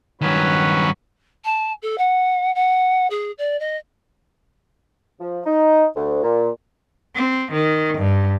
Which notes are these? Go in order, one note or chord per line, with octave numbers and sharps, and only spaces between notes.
G2 D#3 F#3 C#4 B4
A5
A4
F#5
F#5
G#4
D5
D#5
F3
D#4
D2
A#2
C4
D#3
G2